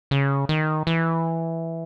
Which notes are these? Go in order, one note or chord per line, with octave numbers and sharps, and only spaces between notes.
C#3
D#3
E3